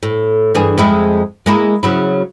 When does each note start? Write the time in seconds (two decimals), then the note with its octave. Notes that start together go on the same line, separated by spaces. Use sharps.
0.03 A2
0.54 G2 E3 G#4
0.78 F2 G#3 E4
1.46 G#3 A#3 E4
1.83 C#3 F#3 E4